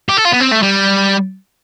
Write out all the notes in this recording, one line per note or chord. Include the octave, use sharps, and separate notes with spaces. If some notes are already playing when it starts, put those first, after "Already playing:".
G4
A4
F4
B3
C4
A3
G3